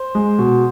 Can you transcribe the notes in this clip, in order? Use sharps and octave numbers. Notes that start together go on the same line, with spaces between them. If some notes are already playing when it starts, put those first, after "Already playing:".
Already playing: C5
G#3
B2